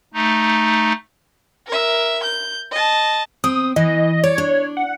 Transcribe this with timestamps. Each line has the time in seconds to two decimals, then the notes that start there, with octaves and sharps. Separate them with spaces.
0.14 A3 D#4
1.67 A#4 E5
2.23 G6
2.71 D#5 A5
3.44 C4 D#6
3.76 E3 D#5
4.24 C#5 D5
4.38 D4
4.77 F#5